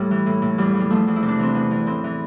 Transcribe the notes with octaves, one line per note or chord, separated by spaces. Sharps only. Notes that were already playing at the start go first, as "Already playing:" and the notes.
Already playing: A2 G3
E3
A2
A2
E2 G3
E2
G3
F3 A3
E2
E4
C3
D4
E3 C4
E2 B3
E3
A2 C4
E3